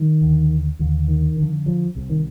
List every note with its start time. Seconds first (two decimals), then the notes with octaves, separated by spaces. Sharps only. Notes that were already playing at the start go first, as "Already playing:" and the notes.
Already playing: D#3
0.21 D#2 D3
0.79 D#2 D3
1.08 D#3
1.37 F2 D3
1.66 F3
1.95 C2 C3
2.10 D#3